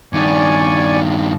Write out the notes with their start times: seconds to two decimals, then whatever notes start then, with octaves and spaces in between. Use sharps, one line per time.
0.13 G2 D#3 D5 G#5 C#6